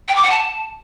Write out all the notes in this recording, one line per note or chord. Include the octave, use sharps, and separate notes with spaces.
G5
D6
F#5
A5